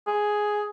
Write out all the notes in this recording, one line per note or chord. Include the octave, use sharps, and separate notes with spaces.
G#4